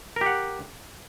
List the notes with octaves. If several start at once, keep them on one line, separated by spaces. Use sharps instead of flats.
G4 A#4 F#5